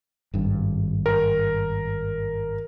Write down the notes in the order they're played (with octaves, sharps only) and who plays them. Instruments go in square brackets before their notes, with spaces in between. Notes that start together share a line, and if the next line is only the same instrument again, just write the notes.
[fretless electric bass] G#1 G2
[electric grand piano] A#4